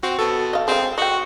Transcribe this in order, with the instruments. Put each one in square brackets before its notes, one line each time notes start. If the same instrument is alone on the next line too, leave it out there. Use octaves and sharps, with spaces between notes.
[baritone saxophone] C4 [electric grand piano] F#4
[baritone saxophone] B2 [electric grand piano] A4
[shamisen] D#5 F5
[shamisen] G#3 F5 [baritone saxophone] C4
[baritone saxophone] F#4 [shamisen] D#5 G5